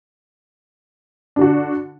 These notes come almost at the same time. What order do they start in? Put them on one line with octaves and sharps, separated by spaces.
D4 D3 F#4